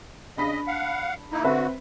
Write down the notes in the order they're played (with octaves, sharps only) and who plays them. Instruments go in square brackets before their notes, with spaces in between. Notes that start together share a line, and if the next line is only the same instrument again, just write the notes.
[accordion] C#3 D#5 [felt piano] D4 B5 B6
[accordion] F5 F#5
A#3 D#4 E4
[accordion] D3 F#4 [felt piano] C4 B4 E5